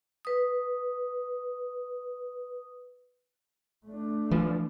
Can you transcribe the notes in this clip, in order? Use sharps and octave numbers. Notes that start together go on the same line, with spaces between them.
B4 D#6
A3 D4
E3 F3